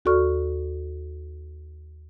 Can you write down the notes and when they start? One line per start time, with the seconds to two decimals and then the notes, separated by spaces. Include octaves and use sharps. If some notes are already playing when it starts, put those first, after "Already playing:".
0.05 D#2 F#4 A4 D5 C#6 F6